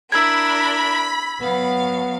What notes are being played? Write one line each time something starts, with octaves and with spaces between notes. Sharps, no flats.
D4 E4 A#4 B5 E6 G#6
F#3 B3 F5